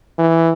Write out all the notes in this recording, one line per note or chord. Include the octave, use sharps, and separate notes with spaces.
E3